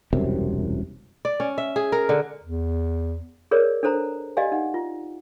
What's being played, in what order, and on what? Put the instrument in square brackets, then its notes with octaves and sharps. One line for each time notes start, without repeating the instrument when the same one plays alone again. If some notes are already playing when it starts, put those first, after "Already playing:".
[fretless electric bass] E1 C2 F#2 C3
[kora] D5
C#4
E5
G#4
A#4
D3
[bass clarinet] E2
[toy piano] G#4 A#4 B4 C#5 D5
D4 A4 C5 A#5
G4 D5 D#5 F5 G#5
D#4 F#5
F4